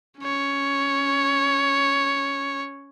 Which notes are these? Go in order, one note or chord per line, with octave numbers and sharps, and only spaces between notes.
C#4 C#5